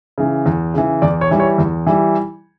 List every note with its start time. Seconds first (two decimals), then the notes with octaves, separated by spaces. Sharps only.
0.18 C#3 E3
0.46 E2
0.74 C#3 E3
1.02 E2 D5
1.21 C#5
1.31 E3 G3
1.40 C#5
1.58 E2
1.87 E3 G3